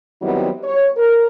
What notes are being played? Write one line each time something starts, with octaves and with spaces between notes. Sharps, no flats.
D#3 F#3 G3 B3 C4 E4
C#5
A#4